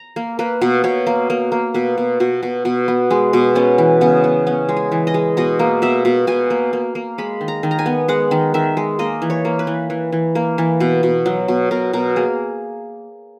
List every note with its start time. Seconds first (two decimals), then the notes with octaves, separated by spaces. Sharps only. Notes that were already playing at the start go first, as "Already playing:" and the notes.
Already playing: A#5
0.16 A#3
0.39 A#3 B4
0.61 B2
0.84 B2 C#5
1.07 A#3
1.30 A#3
1.52 A#3
1.74 B2 B4
1.98 B2
2.20 B2 F#4
2.43 B2
2.65 B2
2.88 B3
3.10 G#3
3.33 B2
3.55 B3 C#4
3.78 E3
4.01 C#3 B3
4.24 B3
4.47 B3 C#4
4.69 G#3
4.76 G#4
4.92 E3
5.07 D#5
5.14 G#3
5.37 B2 D#5
5.59 A#3
5.82 B2 E5
6.05 B2
6.27 B2 G#5
6.50 A#3
6.73 A#3
6.95 A#3
7.18 G#3 B5
7.41 D#3
7.48 A#5
7.63 D#3
7.71 A#5
7.79 G#5
7.86 B3
8.08 G#3 F#5
8.31 D#3
8.54 D#3 E5
8.77 G#3
8.99 A#3 D#5
9.22 E3
9.30 C#5
9.45 A#3
9.59 B4
9.67 E3
9.90 E3
10.12 E3
10.35 A#3
10.58 E3
10.80 B2
11.03 B2
11.26 F#3
11.48 B2
11.71 B2 A#4
11.93 B2 A#4
12.16 A#3 G#4